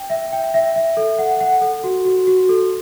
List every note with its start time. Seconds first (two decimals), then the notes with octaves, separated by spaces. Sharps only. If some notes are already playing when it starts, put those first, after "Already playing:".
Already playing: G5
0.10 E5
0.32 G5
0.54 E5
0.76 E5
0.97 A4
1.19 F#5
1.40 F#5
1.61 A4
1.84 F#4
2.05 F#4
2.27 F#4
2.49 A4